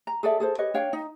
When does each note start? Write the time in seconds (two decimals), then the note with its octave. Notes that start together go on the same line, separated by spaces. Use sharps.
0.07 A#5
0.23 G#4 A4 D5 E5
0.40 G#4 A4 C5
0.58 G4 B4 C#5 D#5
0.74 D4 C#5 F5 G5
0.93 D#4